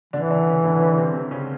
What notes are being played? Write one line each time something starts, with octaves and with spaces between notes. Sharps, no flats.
D3 E3 D4
D3 D4
C#3 C#4
D3 D4
C#3 C#4
C3 C4
C3 C4
C#3 C#4